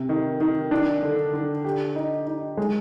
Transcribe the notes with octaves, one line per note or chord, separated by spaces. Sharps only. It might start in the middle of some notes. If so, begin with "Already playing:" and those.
Already playing: C3
D#3
D#3
D4
D3
D3
G4
D#4
D#4
G#3